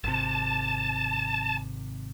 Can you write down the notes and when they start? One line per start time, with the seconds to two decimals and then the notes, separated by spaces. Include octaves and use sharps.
0.04 G#1 C3 A5